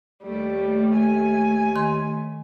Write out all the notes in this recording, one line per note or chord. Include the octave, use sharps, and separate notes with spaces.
D#2 G3 A3
G#5
D#3 C6